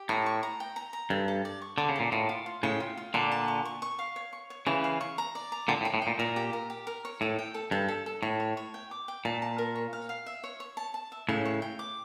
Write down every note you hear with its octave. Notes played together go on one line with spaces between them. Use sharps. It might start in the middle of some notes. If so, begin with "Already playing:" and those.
Already playing: G4
A2 A#5
C#6
A#5
G5
A#5
A#5
G2 A4
A4
D5
C#6
D3 D5
C#3
A#2 A4
A2 F4
F4
F4
A2 C#3 G5
F4
F4
A#2 D3 A5
A5
C#6
C#6
C#6
F5
C#5
C#6
C#5
C#3 E3 C#6
F5
C#6
A#5
D5
A#5
A#2 D3 G5
A2
G5
A2
G5
A#2
A#2 A#4
G4
A#4
G4
A#4
C#5
A2 A4
G5
A4
G2 A4
A4
A4
A2 C#5
C#5
C#5
G5
D6
G5
A#2 A5
A5
A#4
C#5
F5
F5
E5
C#5
C#5
A5
A5
E5
A2 C#3 E5
C#5
G5
D6